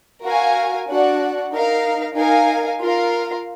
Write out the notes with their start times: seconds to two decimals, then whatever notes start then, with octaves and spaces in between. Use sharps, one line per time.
0.24 F#4 A#4 F5 G#5
0.88 D4 F#4 D5 F#5
1.53 D#4 A#4 F5
2.16 D#4 A#4 F5 G#5
2.81 F4 A#4 F5